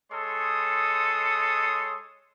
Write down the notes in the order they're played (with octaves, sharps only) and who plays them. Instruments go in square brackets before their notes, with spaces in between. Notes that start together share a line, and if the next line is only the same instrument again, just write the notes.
[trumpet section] G#3 A4 C#5 C6 D#6